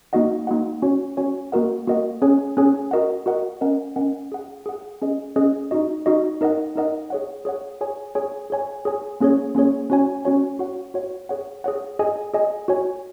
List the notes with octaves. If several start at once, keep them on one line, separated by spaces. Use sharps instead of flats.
A#3 D#4 F#4 D#5 F#5
A#3 D#4 F#4 D#5 F#5
C#4 F#4 C#5 G#5
C#4 F#4 C#5 G#5
A#3 F#4 A#4 D#5 F#5
A#3 F#4 A#4 D#5 F#5
C#4 G#4 C#5 G#5
C#4 G#4 C#5 G#5
F#4 A#4 D#5 F#5
F#4 A#4 D#5 F#5
C#4 A#4 D#5 F#5
C#4 A#4 D#5 F#5
G#4 F#5
G#4 F#5
C#4 G#4 D#5
C#4 G#4 D#5
D#4 F#4 D#5
D#4 F#4 D#5
D#4 A#4 D#5 F#5
D#4 A#4 D#5 F#5
G#4 C#5 F#5
G#4 C#5 F#5
G#4 C#5 G#5
G#4 C#5 G#5
G#4 C#5 G#5
G#4 C#5 G#5
A#3 C#4 G#4 C#5
A#3 C#4 G#4 C#5
C#4 F#4 C#5 G#5
C#4 F#4 C#5 G#5
F#4 C#5 F#5
F#4 C#5 F#5
G#4 C#5 F#5
G#4 C#5 F#5
G#4 D#5 G#5
G#4 D#5 G#5
F#4 C#5 G#5